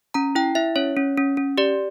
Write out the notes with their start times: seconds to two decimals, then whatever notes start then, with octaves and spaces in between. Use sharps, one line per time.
0.14 C#4 A#5
0.35 E4 G5
0.55 E4 E5
0.76 C#4 C#5
0.97 C#4
1.17 C#4
1.37 C#4
1.58 G4 D5